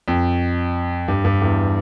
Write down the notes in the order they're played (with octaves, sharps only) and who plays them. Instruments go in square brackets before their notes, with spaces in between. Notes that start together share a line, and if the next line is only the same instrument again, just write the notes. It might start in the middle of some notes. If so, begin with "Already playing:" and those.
[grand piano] F2
G2
G2
E2